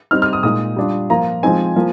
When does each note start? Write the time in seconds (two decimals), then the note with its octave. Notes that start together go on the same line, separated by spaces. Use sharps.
0.11 G3 C4 D#4 F6
0.22 F6
0.33 D#6
0.43 A#2 G#3 D#4 D#6
0.76 G3 D4 F4
1.10 F3 A#3 F4 A#5
1.43 F3 G#3 C4 D#4 G#5
1.76 F3 A#3